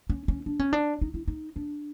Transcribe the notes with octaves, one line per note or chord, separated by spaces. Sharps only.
C#4
C#4
D4
C#4
D4
D#4
E4
D#4
D4